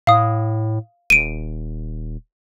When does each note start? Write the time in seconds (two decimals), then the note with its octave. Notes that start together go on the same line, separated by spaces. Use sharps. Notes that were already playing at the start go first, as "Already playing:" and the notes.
0.07 A2 F5 D#6
1.10 D#1 D7 D#7